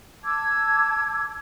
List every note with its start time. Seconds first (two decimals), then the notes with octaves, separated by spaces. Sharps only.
0.24 A5 D6 E6 G#6